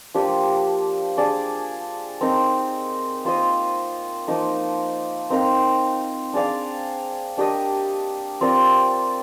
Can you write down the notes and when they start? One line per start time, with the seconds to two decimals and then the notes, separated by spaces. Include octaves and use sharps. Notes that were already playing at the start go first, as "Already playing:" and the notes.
0.14 F3 A#3 D4 G4
1.17 D4 G#4 D5
2.21 C4 D#4 A#4
3.25 A#3 F4 C5 D#5
4.28 F3 A#3 D#4
5.30 C4 D#4 A#4 F5
6.34 D4 G#4 D5 F5
7.38 D4 G4 A#4 D#5
8.41 C4 F4 A#4 D5